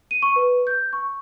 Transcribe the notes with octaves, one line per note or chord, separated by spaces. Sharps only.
D#7
C#6
B4
G6
C#6